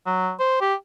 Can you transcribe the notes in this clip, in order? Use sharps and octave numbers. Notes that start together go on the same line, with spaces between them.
F#3
C5
G4